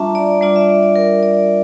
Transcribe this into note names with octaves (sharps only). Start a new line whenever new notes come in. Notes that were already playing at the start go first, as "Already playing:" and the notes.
Already playing: G3 D4 F4 E5 A5 A#5 C#6
D5
G3 D4 F4 D5
E5
D5
D5
A#4
D5